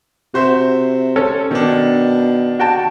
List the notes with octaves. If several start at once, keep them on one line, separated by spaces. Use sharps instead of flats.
C3 F#4 C5 E5
C#4 A4 C#5
B2 D#3 D4
F#4 G5 A5